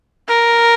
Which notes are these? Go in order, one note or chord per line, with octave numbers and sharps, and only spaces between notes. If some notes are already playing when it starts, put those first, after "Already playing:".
A#4